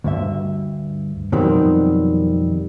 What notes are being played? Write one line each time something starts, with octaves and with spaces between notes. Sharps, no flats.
D2 G2 E5
F2 B2 D#3 F#3 G3 C4